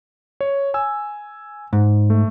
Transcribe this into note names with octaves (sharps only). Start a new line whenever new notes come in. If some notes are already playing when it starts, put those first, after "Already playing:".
C#5
G#5 E6
G#2
A3